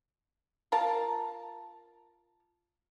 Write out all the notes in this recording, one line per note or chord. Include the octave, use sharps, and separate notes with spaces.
F4 A#4 F5 A5